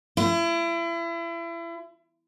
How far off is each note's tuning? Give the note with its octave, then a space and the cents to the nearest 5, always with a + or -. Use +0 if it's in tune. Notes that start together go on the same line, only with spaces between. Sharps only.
E4 +35